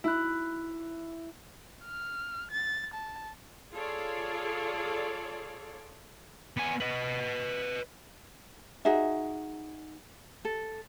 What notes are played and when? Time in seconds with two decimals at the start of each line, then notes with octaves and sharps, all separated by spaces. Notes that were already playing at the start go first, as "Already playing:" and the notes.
0.04 E4 F#6
1.85 F6
2.52 A6
2.94 A5
3.72 F4 G#4 A4 C#5 D5
6.57 B3 G#5
6.80 B4 D#5
8.85 D#4 F#4 G#4 E5
10.45 A4